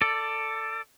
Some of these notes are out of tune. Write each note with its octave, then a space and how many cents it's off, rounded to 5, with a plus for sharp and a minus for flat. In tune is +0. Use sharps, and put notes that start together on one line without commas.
A4 +15 D5 +0